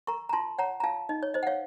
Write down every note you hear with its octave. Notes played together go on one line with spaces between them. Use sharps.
A#4 A#5 C#6
A#5
F4 A5 C6
C#5 F#5 A#5
A#5
F4 F5 A5
D#4 D#5
C#5
C5 D#5
F#5
C#5 F5